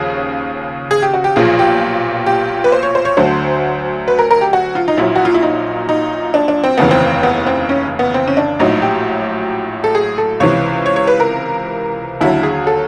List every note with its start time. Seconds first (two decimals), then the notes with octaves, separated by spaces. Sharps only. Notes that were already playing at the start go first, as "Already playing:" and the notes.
Already playing: D#2 C#3 F3 G#4
0.91 G#4
1.02 G4
1.14 F#4
1.24 G4
1.36 B1 A#2 F3 G#4
1.59 G4
2.26 G4
2.64 B4
2.72 C5
2.83 C#5
2.95 C5
3.05 C#5
3.17 D2 D3 F#3 C5
4.08 B4
4.19 A#4
4.31 A#4
4.41 G4
4.53 F#4
4.75 F4
4.88 D#4
4.97 A#1 A#2 F#3 E4
5.16 F#4
5.25 F4
5.34 E4
5.42 D#4
5.89 D#4
6.34 D4
6.48 D4
6.64 C4
6.78 F1 D#2 C#3 E3 B3
6.91 C4
7.23 B3
7.46 C4
7.69 C#4
7.99 B3
8.14 C4
8.28 C#4
8.37 D4
8.59 A#1 A2 F#3 D#4
8.82 G4
9.84 A4
9.95 G#4
10.18 A4
10.40 C#2 C3 E3 C#5
10.86 C#5
10.96 C#5
11.07 B4
11.20 A#4
12.21 D#2 D3 F#3 E4
12.43 G#4
12.67 A4